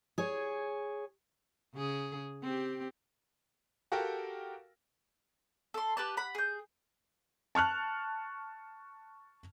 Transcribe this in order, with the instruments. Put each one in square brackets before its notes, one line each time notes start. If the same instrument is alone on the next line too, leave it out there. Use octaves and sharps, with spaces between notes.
[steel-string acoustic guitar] G#4 C#5
[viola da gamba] C#3 G#4
C4 G4
[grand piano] F#4 G4 A4 A#4 F5 G5
[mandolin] A4 C6
G4 B4 A5
F#5 B5
G#4 G6
[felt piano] A5 C#6 F6 F#6